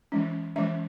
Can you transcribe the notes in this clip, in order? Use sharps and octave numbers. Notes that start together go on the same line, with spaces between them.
E3 G#3 C#4
E3 G#3 C#4 E5